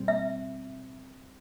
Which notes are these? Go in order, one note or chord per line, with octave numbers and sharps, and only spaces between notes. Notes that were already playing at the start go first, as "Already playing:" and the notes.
Already playing: B2 G3 C4
E5